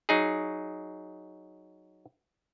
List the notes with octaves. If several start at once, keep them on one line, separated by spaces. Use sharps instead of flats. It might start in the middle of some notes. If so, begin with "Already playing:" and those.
F#3 D#4 G#4